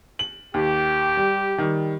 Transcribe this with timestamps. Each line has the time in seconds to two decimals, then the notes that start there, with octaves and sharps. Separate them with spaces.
0.19 F#7
0.54 D#2 G4
1.17 G3
1.58 D#3 G3